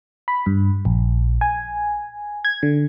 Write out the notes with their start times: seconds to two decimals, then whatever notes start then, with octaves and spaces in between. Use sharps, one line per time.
0.28 B5
0.46 G2
0.85 A#1
1.41 G#5
2.45 G#6
2.63 D3